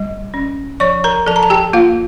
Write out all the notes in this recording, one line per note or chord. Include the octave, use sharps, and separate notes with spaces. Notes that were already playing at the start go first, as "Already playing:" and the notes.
Already playing: G3
C#4
F3 C#5 C#6
A#4 A#5
F3 A4 A5
A#5
A5
G4 G5
A#3 F4 F5